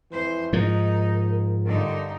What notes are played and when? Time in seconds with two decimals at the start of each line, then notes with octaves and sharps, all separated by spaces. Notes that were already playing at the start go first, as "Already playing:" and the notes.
0.11 F2 E3 C5
0.53 G#2 F3 D#4 A#4
1.66 G2 D3 D#4